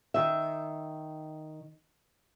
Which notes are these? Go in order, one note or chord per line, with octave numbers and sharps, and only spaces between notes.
D#3 E5